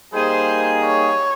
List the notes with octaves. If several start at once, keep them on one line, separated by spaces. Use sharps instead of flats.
G3 A#3 D#4 G#4 C5
C#5